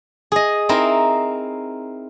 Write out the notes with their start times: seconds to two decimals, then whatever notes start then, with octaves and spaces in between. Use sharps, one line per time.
0.32 G#4 D#5
0.69 C4 D#4 E4 A#4